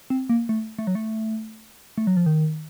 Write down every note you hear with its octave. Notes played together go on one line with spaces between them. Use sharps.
C4
A#3
A3
A3
F#3
A3
A3
F#3
F3
D#3